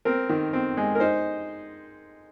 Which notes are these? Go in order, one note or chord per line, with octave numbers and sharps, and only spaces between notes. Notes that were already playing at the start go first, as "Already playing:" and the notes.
C4 A#4
D#3
C4
G#3
A#4
D#4 C5